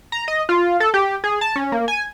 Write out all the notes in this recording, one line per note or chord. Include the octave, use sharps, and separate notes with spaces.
A#5
D#5
F4
A4
G4
G#4
A5
C#4
A#3
G#5